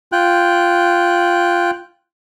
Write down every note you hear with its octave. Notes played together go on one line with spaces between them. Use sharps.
F4 G5 F#6